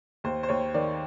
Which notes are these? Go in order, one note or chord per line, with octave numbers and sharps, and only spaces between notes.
D#2 C5
C5
D#2 C#5
D#3 D5